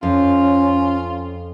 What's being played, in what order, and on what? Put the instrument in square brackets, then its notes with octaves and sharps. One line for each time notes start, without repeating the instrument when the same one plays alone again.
[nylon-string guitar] F2 [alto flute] C#4 [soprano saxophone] F4